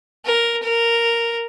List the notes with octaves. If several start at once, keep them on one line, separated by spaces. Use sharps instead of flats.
A#4
A#4